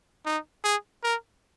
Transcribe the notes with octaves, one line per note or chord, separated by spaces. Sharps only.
D#4
G#4
A#4